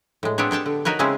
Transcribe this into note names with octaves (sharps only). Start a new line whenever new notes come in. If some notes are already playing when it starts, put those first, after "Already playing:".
A2 G#3
B3 C4 D4 G4 G#4 C#5
D4 C#5 G5 A5
D3
D#4 F#4 A#4 B4 C#5
C#3 G#3 C4 C#4 E4 G#4